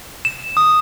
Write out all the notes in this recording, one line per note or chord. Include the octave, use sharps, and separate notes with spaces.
E7
D#6